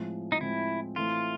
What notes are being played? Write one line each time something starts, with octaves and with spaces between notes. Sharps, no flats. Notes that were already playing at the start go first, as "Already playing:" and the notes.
Already playing: A2 F3 G#3 C4
D#4
A2 F3 G#3 C4 E4
A2 E3 A3 C4 F4